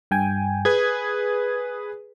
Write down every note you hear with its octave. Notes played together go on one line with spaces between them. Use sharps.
G2 G5 G#5
G#4 B4 G#6